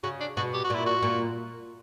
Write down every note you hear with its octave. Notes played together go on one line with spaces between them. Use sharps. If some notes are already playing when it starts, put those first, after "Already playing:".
C#3 F#4
D4
B2 F#4
G4
F#4
A#2 E4
F#4
A#2